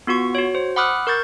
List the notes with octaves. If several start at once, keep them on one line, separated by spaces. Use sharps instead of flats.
B3 F4 F#4 C#6
F#4 C#5
C5
F#5 B5 D6 D#6 F6 F#6
A#4 C#6 G6 A6